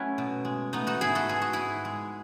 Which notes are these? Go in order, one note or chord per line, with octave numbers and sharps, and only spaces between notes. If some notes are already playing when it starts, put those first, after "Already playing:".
Already playing: F#3 A3 C#4 E4 F#4
B2
G#3
A3 B3 D#4
D#4 F#4
G#2 E4 G#4
F#4 A4
G#3 G#4
F#4
G#2 E4 G#4
G#3